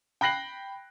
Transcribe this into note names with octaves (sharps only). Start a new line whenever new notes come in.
G5 B5 F#6 A#6 C7 F#7